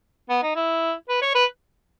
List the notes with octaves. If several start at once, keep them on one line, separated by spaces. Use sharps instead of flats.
B3
D#4
E4
B4
C#5
B4